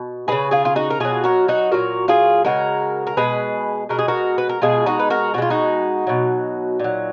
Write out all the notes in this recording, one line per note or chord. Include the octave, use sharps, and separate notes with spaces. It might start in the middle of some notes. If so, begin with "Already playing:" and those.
Already playing: B2
C#3 G#3 G#4 B4
F4 G#4
F4
D#4 F#4
A#4
B2 F#3 F4 G#4
F#4 A#4
D#4 F#4
A#2 F#3 F#4 A#4
F4 G#4
C#3 G#3 F#4 A#4
A#4
B2 G#3 G#4 B4
B2 G#3 A#4
G#4
F#4 A#4
B4
A#4
B2 G#3 F4 G#4
D#4 F#4
B4
F#4 A#4
B2 G#3 F4 F#4
D#4 F#4
B2 F#3
A#2 F#3